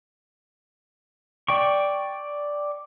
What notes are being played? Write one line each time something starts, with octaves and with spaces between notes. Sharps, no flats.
D5 G5 C#6